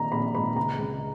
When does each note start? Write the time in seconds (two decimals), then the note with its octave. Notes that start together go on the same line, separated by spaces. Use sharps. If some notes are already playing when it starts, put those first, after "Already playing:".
Already playing: A#1 D#3 A#5
0.12 A#1 B5
0.35 G#2 B5
0.56 C#2 A#5
0.79 C#2